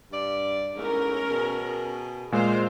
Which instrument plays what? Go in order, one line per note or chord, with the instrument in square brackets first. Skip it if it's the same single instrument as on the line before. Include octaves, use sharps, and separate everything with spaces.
[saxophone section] G2 D5
[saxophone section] E2 G#2 A3 [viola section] C#4 A#4
[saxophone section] B2 G#4
[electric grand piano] A#2 G#3 [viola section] C5 F5